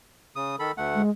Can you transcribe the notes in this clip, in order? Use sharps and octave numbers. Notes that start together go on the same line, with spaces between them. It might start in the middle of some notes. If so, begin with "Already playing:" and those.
C#3 D#6
D#3 A4 B5
D2 A3 F#5
G#3